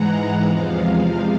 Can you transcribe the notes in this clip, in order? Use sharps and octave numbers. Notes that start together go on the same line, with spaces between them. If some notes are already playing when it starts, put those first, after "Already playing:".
Already playing: G#2 E3 G#3 F#5 A#5
E2 C3 F3 G#3 F5